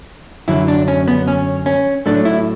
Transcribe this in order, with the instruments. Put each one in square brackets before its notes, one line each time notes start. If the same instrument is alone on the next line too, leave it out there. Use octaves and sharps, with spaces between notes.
[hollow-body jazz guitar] F#2 D3 F#3 E4
D4
C#4
B3
C#4
C#4
A2 F#3 A3 D4
E4